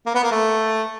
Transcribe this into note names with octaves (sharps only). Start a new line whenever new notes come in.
A#3
B3
A#3
A3